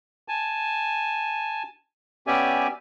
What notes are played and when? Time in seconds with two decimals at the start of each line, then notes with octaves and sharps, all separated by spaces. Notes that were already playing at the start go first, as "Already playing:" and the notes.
0.28 G#5 A5
2.27 B3 C#4 G4 D5 E5 G#5